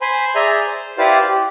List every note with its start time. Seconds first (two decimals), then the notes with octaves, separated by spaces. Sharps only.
0.01 C5 G#5 B5 C6
0.35 G#4 D5 E5 G#5 A#5 G6
0.67 C5
0.98 E4 G4 B4 C5 D5 F5
1.28 G4